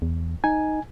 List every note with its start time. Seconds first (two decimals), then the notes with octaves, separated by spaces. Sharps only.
0.02 E2
0.44 D#4 G#5